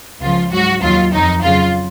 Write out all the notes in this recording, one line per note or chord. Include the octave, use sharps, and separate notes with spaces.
C#2 C#3 F3 F4
G#2 F#3 F#4
D#2 D#3 F#3 F4
F2 D#3 F#3 D#4
F2 C#3 F#3 F4